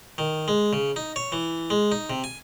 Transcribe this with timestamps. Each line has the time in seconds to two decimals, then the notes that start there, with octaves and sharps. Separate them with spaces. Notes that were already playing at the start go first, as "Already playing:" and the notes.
0.18 D#3
0.48 G#3
0.73 C#3
0.96 D#4
1.16 C#5
1.32 E3
1.70 G#3
1.92 D#4
2.10 C3
2.24 G#5